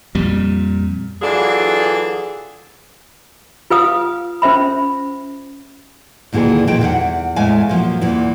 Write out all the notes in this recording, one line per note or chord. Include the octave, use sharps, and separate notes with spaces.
F2 A#2 G3
E3 F#3 D4 F4 G#4 A4
F4 B4 F5 D#6
C#4 C5 E5 B5
D2 A#2 D#3 E3 G#4
A#2 D#3 F3 G5
E2 F#5
E2 A2 G#3 A3 F5 G#5
A#2 F3 F#3
E2 A#2 E3